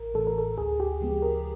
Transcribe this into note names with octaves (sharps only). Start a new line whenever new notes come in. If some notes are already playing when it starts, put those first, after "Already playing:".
Already playing: A1 A#4
A2 E3 A4
A#4
A4
D2 G#4
G4
C#3 F3 G#3 B3
A#4